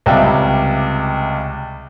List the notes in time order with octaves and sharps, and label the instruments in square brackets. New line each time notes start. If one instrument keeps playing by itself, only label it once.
[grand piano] C#2 C3 G3 E5 G5